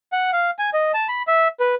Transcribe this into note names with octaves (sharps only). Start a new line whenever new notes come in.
F#5
F5
G#5
D#5
A5
B5
E5
B4